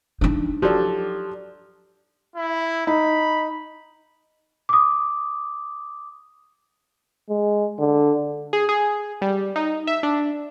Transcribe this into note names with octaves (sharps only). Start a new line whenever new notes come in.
D4 D#4
F3 F#3 G4 A4 D5
E4
D#4 B5
D6 D#6
G#3
D3
G#4
G#4
G3
D#4
E5
D4